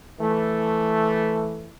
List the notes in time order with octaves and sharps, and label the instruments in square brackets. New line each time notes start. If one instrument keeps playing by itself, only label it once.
[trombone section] E3 A3